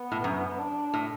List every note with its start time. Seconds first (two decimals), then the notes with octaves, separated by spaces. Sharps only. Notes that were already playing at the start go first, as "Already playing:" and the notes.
Already playing: B3
0.12 A2
0.24 F#2
0.59 D4
0.94 A2